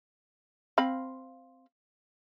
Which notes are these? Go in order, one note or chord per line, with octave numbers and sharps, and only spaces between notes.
C4 F5 B5